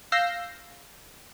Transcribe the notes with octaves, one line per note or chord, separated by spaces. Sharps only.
F5 E6 G6 A#6 C7